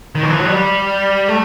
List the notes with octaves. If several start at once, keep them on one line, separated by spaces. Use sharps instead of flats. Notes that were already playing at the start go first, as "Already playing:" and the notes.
D#3
E3
F3
F#3
G3
A3